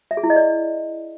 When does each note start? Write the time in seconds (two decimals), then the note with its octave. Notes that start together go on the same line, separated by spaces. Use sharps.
0.11 E5
0.17 G#4
0.24 E4
0.30 D#5
0.36 D5